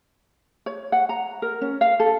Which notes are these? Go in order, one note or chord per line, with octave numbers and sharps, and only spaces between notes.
C#5
F#5
A#5
A#4
C#4
F5
A4